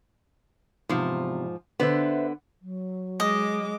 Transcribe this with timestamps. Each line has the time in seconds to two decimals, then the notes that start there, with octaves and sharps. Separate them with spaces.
0.89 E2 G#2 C3 F3
1.80 D3 B3 B4 C5 E5
2.62 F#3
3.20 G#3 D#5 D6